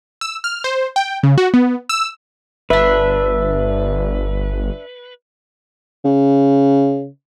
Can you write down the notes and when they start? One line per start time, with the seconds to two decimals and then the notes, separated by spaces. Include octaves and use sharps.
0.21 E6
0.44 F6
0.64 C5
0.96 G5
1.23 C#3
1.38 F#4
1.54 B3
1.89 E6
2.70 G1 D4 B4 E5
6.05 C#3